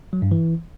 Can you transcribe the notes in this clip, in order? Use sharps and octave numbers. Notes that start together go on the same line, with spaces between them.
F#3
G2
E3